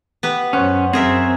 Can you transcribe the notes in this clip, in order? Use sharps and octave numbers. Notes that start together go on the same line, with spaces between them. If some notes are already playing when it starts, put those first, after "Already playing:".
B3 G4 B4
F#2 C#4 C5 C#5 F#5
F#2 C4 G#4 A#4 E5